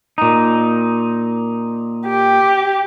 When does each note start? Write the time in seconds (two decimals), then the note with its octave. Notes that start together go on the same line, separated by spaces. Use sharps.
0.18 A#2 D#4
2.07 G4